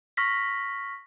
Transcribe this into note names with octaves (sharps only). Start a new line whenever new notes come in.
C#6 F6 A#6 B6